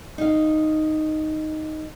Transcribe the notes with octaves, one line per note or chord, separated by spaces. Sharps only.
D#4 F5